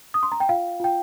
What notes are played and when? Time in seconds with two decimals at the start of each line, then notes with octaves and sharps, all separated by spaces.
0.14 D#6
0.23 C6
0.32 A#5
0.40 G5
0.49 F4 F5
0.80 F4 G5